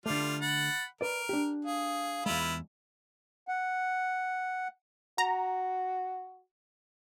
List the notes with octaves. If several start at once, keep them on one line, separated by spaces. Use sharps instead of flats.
D3 G3 A3 F4 D6
F#5 B5 A6
A#4 B4 D5 D7
D4 G4
G#4 F5
E2 G#3 E4 F4 B4
F#5
F#4 A#5